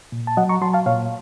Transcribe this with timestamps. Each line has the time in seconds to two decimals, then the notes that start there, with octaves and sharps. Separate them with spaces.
0.12 A#2
0.27 A5
0.37 F#3 D#5 F#5
0.49 A#5 C#6
0.62 F#3 A5 C6
0.73 F5 A5
0.86 A#2 C#5 F5